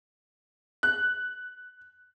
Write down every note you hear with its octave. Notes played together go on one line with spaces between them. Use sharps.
F#6